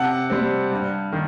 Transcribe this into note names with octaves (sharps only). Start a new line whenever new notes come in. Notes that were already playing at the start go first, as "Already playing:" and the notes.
Already playing: C3 F#5 A5
G3 C4
G2
D#3